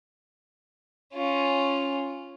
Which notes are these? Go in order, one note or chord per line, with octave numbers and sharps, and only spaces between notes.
C#4 F4